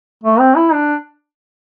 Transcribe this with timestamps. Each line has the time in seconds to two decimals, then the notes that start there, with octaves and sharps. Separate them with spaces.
0.24 A3
0.40 C4
0.56 E4
0.73 D4